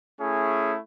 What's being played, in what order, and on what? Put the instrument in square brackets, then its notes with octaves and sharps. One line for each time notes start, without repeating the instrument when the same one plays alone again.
[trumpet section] A3 C#4 E4 G#4